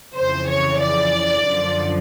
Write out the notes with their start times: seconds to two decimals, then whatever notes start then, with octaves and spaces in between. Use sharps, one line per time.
0.16 F2 C#3 E3 C5
0.48 C#5
0.81 D5
1.47 F#2 D3 F3